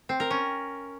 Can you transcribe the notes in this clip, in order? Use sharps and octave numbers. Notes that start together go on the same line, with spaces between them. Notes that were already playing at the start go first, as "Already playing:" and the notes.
C4
A#4
C#4